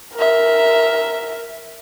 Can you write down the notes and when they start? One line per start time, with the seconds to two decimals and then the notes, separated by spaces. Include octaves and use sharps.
0.15 A#4 E5